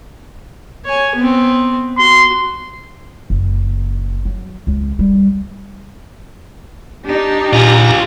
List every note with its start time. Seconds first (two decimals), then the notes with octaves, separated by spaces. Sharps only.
0.85 C#5 G#5
1.15 B3 C4
1.98 F#4 C6
3.30 F#1
4.25 F#3
4.67 C#2
4.99 G3
7.06 D4 D#4 G4
7.53 A#2 F4 G#4 A#5